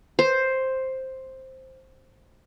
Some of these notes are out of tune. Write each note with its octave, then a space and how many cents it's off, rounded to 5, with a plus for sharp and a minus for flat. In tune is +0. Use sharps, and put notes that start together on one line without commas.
C5 +5